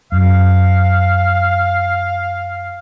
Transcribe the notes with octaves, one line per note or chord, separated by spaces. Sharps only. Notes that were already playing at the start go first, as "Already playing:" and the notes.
F#2 F5